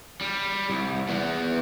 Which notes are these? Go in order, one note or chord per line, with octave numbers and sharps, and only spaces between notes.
G3
C2
E2 B3